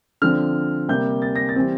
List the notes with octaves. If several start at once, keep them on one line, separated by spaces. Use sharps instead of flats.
D3 F3 C4 F6
C3 G3 A#3 G6
A6
A#6
A6
E3 G3 C4